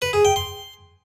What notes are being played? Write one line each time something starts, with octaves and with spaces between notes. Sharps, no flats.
B4
G#4
G5
C6